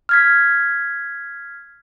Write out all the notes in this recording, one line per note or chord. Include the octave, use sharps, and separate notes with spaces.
F6 G#6 B6